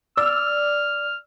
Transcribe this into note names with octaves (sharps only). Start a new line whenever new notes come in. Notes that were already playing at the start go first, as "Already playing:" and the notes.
D5 E6 F6